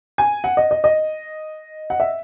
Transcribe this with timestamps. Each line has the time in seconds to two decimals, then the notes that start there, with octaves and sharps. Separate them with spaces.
0.18 G#5
0.44 F#5
0.57 D#5
0.71 D#5
0.84 D#5
1.90 F#5
2.00 E5